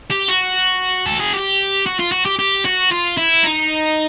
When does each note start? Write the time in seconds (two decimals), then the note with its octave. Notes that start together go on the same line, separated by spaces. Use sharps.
0.11 G4
0.29 F#4
1.06 A4
1.20 G#4
1.34 G4
1.86 F#4
1.99 F4
2.12 F#4
2.25 G4
2.39 G4
2.65 F#4
2.91 F4
3.17 E4
3.44 D#4